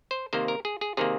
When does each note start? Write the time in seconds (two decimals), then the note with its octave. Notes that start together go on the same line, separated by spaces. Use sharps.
0.11 C5
0.33 C3 D#3 A#3 C5
0.48 A#4
0.65 G#4
0.81 G#4
0.97 C3 D#3 A#3 G#4